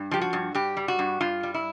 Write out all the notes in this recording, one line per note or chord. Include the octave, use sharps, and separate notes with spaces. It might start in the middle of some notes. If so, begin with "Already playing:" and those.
Already playing: G2
F3 G4
F#4
G2
G2 G4
G3
F#4
G2
G2 F4
G3
E4